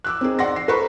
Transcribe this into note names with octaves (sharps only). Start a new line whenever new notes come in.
D6 E6 F#6
C4 D#4 G#4
D5 F#5 C6 A#6
C7
A4 B4 C5 A#5 B5 C#6